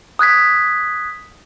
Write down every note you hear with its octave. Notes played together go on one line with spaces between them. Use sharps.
D#6 F#6 G#6 B6